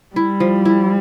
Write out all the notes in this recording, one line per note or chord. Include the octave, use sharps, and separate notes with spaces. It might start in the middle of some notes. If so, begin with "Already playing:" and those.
G3 E4
F3
E4